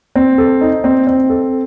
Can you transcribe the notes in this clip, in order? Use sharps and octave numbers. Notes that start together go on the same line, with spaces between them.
C4
A4
D#4
C4
C4
A4